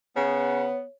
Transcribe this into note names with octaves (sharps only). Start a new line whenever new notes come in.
C#3 B3 C#5